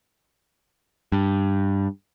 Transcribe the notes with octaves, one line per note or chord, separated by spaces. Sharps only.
G2